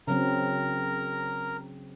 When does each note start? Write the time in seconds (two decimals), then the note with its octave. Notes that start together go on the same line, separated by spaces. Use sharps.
0.08 C#3 F#3 C4 A#4 A#5